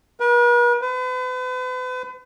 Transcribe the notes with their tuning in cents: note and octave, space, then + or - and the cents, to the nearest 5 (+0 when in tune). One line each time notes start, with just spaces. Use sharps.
B4 -45
B4 +40